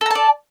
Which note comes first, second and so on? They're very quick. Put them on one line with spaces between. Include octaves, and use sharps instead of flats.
A4 A#5 A5 D5